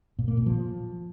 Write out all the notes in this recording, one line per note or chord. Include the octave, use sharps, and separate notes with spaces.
A#2
A#3
A#2
F3